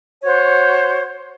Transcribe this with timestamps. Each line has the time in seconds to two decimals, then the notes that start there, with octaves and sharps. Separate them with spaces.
0.23 F#4 C5 C#5